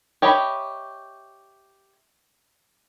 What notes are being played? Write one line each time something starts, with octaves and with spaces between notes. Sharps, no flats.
G4 C#5 D#5 E5 B5